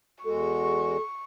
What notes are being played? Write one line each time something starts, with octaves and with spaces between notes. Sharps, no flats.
E2 G#3 F#4 A4 C#6